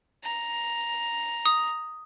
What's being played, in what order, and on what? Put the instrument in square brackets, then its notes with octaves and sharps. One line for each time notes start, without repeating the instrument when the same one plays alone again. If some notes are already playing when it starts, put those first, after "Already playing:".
[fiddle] A#5
[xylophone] D#6